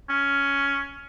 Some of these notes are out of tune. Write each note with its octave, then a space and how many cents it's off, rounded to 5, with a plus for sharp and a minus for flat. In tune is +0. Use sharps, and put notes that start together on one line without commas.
C#4 +10